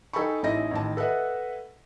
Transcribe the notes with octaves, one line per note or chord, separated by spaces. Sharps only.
D#4 A4 G5 G#5 B5 C#6
A1 C#4 D#4 E4 D#5 A#6
A1 D#3 A5
A4 B4 D#5 E5 F#5